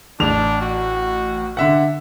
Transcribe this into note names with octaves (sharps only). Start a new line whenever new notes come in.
A1 D4 F7
F#4
D3 E5 F#5